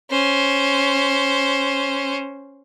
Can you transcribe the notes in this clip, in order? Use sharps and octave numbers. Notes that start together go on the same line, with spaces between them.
C#4 C5